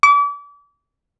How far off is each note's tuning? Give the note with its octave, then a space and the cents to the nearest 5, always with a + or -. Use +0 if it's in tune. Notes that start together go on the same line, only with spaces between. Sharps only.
D6 -35